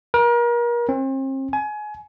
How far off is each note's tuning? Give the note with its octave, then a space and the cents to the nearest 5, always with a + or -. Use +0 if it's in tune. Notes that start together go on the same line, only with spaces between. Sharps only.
A#4 +35
C4 +40
G#5 +25